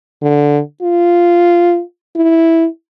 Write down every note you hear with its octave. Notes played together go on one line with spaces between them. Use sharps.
D3
F4
E4